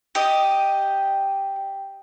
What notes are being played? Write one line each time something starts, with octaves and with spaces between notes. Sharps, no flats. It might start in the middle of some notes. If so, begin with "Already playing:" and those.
G4 D#5